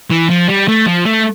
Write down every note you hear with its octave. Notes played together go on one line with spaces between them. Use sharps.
E3
F3
G3
A3
F3
A3